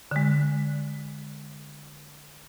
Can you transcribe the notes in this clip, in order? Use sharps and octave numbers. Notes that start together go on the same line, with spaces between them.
D3 G#3